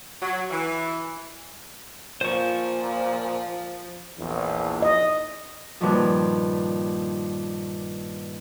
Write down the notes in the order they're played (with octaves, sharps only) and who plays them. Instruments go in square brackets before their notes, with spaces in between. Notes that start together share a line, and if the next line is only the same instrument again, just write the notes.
[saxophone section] F#3
E3
[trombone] A#2 [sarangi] F3 [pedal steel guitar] C5 C#6
[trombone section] A#1 E2
[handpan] D#5
[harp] G2 A#2 D#3 F3